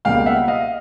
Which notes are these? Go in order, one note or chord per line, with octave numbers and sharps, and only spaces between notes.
C#2 B2 G3 A#3 F5 G5
E5 F#5
D#5 F5